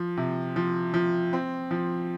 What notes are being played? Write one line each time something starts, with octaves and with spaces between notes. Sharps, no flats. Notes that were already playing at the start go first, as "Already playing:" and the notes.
Already playing: F3
C3
F3
F3
C4
F3